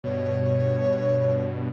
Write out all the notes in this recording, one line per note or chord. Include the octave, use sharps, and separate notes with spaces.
G2 B2 C#5